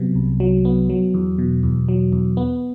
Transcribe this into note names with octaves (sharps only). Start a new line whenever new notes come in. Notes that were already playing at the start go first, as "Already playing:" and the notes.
Already playing: C3 F#3 B3
C2
F#3
B3
F#3
E2
B2
E2
F#3
E2
B3